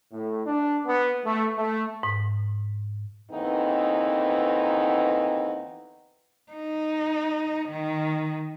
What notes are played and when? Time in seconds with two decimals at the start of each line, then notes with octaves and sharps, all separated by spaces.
0.12 A2
0.47 D4
0.86 B3
1.24 A3
1.57 A3
2.03 G#2
3.32 D#2 D3 E3 B3 C4 D#4
6.52 D#4
7.68 D#3